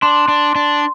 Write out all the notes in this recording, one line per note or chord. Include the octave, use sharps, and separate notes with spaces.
D4 C6
D4
D4